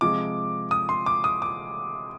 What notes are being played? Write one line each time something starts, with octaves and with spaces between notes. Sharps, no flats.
C3 F3 G#3 D6
D#6
C6
D6
D#6
D6